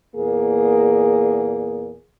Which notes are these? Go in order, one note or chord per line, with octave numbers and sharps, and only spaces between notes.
E2 A#2 A#3 G#4